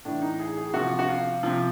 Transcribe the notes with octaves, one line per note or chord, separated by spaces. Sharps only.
A2 E3 D4
D#4
G#4
G#4
C3 F3 F#4
F#4
F4
C3 F3